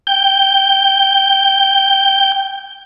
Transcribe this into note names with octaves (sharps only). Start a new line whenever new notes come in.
G5 G6